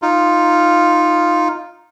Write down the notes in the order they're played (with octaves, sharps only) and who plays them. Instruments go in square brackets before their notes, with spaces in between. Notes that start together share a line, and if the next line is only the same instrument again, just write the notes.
[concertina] D#4 F4